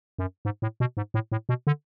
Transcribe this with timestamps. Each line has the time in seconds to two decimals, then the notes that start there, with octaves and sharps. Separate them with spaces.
0.19 F#2
0.45 G#2
0.62 A2
0.80 B2
0.97 G#2
1.14 A2
1.32 A2
1.49 B2
1.67 D3